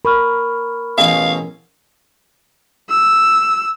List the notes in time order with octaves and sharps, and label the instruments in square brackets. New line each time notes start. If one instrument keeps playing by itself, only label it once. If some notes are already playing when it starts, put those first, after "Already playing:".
[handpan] A#4 [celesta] B5 C#6 F6
[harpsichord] A1 B2 G#4 [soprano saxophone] F5
[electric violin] E6